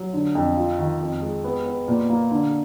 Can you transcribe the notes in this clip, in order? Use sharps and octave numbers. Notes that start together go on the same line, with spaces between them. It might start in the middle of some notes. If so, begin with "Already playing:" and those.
Already playing: F#3
D3
F2
F4
D#3
F2
G#3
B3
B3
A#2
A#3
D3